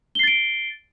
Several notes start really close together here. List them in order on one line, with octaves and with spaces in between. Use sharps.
G7 C7 A6 D7